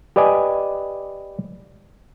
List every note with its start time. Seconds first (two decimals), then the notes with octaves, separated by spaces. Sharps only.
0.16 G4 B4 D5 D#5 G#5